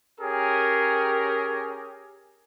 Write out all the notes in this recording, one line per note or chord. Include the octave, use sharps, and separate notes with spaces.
C#4 G4 G#4 A#4